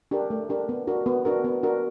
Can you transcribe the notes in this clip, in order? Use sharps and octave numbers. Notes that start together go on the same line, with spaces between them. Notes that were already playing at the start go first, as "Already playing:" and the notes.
D4 G4 A#4
A3
D4 G4 A#4
B3
D4 F#4 A#4
B3
D4 F#4 A#4
B3
D4 F#4 A#4